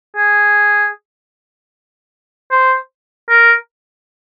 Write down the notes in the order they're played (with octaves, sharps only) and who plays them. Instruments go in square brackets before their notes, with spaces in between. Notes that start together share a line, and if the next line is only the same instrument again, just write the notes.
[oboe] G#4
C5
A#4